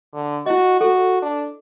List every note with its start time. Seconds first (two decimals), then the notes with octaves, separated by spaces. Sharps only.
0.14 D3
0.46 E4 F#4 D#5
0.81 F#4 A4
1.22 D4